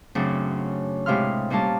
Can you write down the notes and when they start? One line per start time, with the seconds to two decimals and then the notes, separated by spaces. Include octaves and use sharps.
0.15 F#2 C#3 F#3 A3 C4 D4
1.06 A2 C3 G#3 F5 C6 F6
1.50 A#2 G3 C#4 F4 A#4 A5